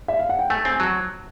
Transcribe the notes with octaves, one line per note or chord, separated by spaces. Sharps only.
E5
F5
F#5
G5
A3 G#5
C4 G#5
G#5
F#3 A5